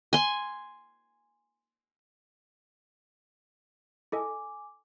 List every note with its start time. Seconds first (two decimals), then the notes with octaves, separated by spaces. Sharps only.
0.13 G#5 C6
4.12 E4 A4 D#5 G#5 D6